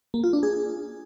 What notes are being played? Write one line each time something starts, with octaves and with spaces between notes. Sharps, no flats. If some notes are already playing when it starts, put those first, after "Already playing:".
A#3
F4
D4
G#4